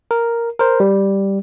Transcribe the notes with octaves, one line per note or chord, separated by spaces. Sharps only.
A#4
A#4 C5
G3